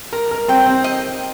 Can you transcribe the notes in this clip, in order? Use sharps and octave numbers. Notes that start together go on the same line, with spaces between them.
A#4 A#5
A#4
C4 G5
C4
D#5